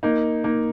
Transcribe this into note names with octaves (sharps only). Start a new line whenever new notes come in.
A#3 D#4
A#3 D#4